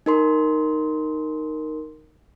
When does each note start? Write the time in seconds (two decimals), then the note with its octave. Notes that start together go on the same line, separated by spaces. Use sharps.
0.06 D#4 A#4 C6